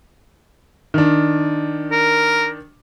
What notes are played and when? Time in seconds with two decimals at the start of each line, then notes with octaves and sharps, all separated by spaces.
0.94 D#3 D4
1.91 A#4